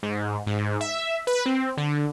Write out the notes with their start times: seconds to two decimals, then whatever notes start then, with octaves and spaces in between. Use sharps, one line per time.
0.03 G#2
0.47 G#2
0.81 E5
1.27 B4
1.46 C4
1.77 D3